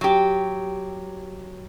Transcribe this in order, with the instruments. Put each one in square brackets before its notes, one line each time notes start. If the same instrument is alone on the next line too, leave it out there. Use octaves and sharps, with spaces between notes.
[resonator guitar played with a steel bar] F#3 G4